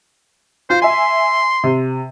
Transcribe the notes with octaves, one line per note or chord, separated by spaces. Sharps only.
F4 C5
E5 G#5 C6
C3